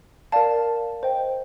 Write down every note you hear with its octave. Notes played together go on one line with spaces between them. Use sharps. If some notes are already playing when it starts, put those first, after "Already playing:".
A#4 D5 F5 A5
C5 D#5 G5